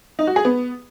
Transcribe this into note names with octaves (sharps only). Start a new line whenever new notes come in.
D#4
F#4
G#4
B3